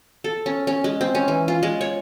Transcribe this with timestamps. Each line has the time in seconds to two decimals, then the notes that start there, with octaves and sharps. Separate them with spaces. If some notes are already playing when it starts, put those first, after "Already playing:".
0.24 A4
0.46 C#4
0.67 C#4
0.84 G#3
1.01 C4
1.15 C#4
1.28 E3
1.48 F4
1.63 G#3
1.81 C#5